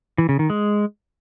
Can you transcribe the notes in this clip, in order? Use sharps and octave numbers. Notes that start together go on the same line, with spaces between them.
E3
C#3
D#3
G#3